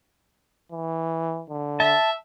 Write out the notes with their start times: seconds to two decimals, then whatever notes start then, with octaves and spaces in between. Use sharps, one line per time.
0.72 E3
1.50 D3
1.80 E5 A5